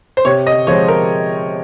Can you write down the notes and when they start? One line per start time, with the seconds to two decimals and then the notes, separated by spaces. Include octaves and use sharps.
0.17 C5
0.25 C3 C#5
0.47 D#5
0.67 F3 G#3 C4 C#5
0.88 A#4